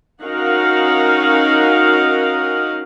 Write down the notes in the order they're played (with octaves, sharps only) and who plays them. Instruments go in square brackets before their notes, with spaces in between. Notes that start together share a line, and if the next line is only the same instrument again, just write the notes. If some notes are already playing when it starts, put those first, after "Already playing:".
[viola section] C#4 D#4 F#4 A#4 F5 F#5